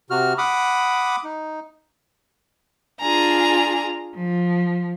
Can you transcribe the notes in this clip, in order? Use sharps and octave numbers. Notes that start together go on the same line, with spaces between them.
C3 F#4 F6
F#5 B5 D6 D#6
D#4
D4 F4 G#4 A#5
F3